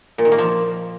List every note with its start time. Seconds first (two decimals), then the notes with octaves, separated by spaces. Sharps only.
0.18 A#2
0.25 D#3
0.32 A#3
0.38 F3